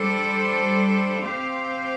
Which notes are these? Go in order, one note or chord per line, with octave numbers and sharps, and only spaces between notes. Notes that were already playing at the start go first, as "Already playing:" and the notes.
Already playing: G3 D4 A4 C5
C4 G4 C5 F5